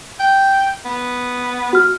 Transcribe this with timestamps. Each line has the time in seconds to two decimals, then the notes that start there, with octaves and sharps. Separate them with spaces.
0.20 G5
0.85 B3
1.73 F#4 F6